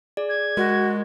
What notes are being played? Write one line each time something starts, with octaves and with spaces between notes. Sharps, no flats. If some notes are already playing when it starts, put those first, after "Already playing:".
G#4 D5
G#6
G#3 F#4 A#4